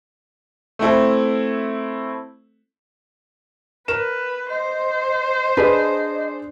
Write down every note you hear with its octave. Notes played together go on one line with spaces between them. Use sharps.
A3 C4 E4 A4
A#4 B4 C#5 E7
C5 D#5
D4 G#4 B4 D5 D#5